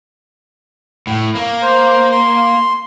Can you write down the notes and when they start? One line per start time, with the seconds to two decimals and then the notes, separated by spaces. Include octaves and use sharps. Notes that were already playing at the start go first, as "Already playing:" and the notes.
1.07 A2
1.35 A#3
1.62 C5
2.12 C6